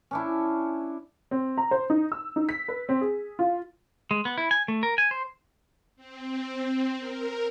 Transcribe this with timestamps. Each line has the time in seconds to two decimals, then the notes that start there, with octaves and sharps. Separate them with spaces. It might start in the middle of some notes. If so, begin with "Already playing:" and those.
0.11 C#4 D4 E4
1.31 C4
1.58 A#5
1.71 C5
1.90 D#4
2.12 E6
2.36 D#4
2.49 B6
2.68 B4
2.89 C4
3.01 G#4
3.39 F4
4.11 G#3
4.25 B3
4.38 E4
4.51 G#5
4.68 A3
4.83 A#4
4.98 G#5
5.11 C5
5.96 C4
6.98 A#4